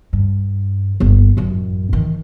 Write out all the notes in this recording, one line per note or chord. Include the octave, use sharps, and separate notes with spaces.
G2
G1 A#3
A1 F#2
D#3 E3